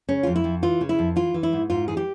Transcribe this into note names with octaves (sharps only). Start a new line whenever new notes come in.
C#3 C#4
F2 F4
E4
F2
E3 F4
C#3
E4
F2
E3 F4
E3
E4
G#2
G#2 F4
E3 G#4
G4